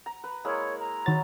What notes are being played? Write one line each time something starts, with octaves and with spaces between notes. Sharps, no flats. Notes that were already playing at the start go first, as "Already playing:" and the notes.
A#5
B4
G#3 A#3 E4 C#5
A#5
D#3 F#3 A6